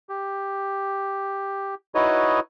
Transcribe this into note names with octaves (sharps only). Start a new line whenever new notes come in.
G4
D#4 E4 F#4 B4 C#5 D#5